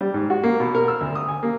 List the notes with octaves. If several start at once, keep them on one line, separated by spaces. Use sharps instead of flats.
G3
G#2
F#4
A#3
B2
A#4
E6
D2
D#6
G#5
A#3